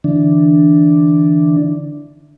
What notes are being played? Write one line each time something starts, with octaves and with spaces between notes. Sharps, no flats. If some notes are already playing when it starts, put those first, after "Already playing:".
D3 E3 D4